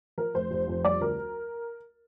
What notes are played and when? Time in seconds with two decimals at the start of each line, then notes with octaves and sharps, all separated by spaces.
0.18 F3 A#4
0.34 F1 C5
0.51 F1
0.68 F2
0.85 G3 D5
1.01 D2 A#4